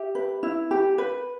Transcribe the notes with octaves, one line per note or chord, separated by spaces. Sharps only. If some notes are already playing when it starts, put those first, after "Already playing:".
Already playing: G4 E5 G5
B4
E4
G4
B4